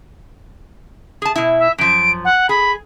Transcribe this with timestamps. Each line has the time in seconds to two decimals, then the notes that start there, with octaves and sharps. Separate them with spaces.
1.22 G#4 A5
1.36 B2 E4
1.59 E5
1.78 F#2 F3 D7
2.24 F#5
2.49 G#4 B5